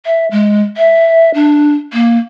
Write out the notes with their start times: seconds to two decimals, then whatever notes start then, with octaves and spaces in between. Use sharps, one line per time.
0.06 E5
0.31 G#3
0.77 E5
1.34 D4
1.93 A#3